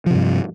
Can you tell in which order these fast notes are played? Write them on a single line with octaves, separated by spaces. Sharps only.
F3 C3 G2